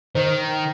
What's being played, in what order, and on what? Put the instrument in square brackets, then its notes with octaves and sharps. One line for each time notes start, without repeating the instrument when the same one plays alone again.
[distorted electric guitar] D#3 [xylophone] C5